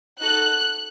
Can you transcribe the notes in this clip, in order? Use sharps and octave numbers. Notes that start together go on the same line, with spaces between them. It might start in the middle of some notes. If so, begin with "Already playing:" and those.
D#4 F#4 A4 F#6